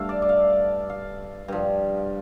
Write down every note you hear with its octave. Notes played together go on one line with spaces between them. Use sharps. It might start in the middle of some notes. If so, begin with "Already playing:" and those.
Already playing: G2 A3 A4 F5
D5
D5
F5
F5
G2 F3